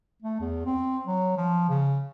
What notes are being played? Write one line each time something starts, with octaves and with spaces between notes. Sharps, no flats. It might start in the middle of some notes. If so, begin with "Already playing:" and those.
A3
E2
C4
F#3
F3
C#3